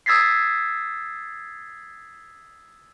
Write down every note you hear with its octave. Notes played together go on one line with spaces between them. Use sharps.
D#6 E6 G#6 A6 B6 C7